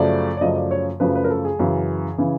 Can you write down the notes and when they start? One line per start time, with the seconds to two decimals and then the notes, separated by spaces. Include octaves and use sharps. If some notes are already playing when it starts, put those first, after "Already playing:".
Already playing: F#2 C#3 F3 A3 D5
0.37 D5
0.41 F#2 C#3 F3 A3 D#5
0.56 D5
0.71 C#5
1.00 F#2 C#3 F3 A3 B4
1.15 B4
1.24 A#4
1.30 A4
1.45 G#4
1.59 F#2 C#3 E3
2.18 C#3 E3